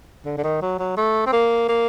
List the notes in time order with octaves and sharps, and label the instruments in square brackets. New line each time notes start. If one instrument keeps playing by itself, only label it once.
[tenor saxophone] D3
D3
D#3
F#3
F#3
A3
C4
A#3
A#3